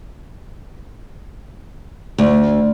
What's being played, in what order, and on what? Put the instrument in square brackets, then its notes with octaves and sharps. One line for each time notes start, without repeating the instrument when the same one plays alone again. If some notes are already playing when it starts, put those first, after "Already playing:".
[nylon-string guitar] D2